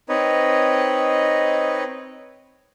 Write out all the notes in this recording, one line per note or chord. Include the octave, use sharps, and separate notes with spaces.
C4 D#4 B4 C#5 D#5